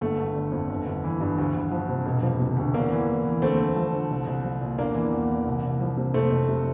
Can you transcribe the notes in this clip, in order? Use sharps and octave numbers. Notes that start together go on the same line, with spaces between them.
G1 A3
G1
D3
F2
G1
G1
E3
G2
D2
D2
F3
C3
E1
F3
C3
D2
E2 A#3
E3
E2
E3
D2 A3 C4
D2
F3
D3
C2
C2
F3
A#2
E2 A#3 D4
E3
E2
E3
C2
C2
F3
C3
F1 A3 C4
F1
C3